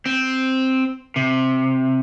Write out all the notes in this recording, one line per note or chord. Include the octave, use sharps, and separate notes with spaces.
C4
C3